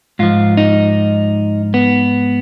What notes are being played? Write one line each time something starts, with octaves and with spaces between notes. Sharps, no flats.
G#2 F3 F4
D#4
B3